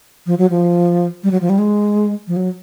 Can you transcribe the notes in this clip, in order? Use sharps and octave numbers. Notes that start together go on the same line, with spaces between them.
F3
F#3
F3
G3
F#3
F3
G3
G#3
F3
F#3